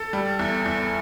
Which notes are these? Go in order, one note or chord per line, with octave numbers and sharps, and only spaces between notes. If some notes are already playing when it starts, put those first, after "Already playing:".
Already playing: A4
G3
E2
E2